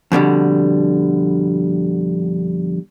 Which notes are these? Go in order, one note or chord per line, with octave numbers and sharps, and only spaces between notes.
F2 B2 D3 G3